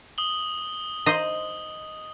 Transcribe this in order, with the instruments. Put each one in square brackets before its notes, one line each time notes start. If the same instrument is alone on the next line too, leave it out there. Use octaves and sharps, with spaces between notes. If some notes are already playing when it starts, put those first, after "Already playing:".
[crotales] D#6 F#7 G7
[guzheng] C5 D#5